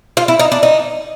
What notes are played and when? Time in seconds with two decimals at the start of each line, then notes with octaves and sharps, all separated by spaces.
0.17 F4
0.28 E4
0.39 D#4
0.52 D4
0.63 D#4